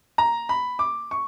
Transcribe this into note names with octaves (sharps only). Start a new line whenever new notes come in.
A#5
B5
D6
C#6